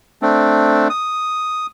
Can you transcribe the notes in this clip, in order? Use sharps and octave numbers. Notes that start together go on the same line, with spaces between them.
A3 C4 D4
D#6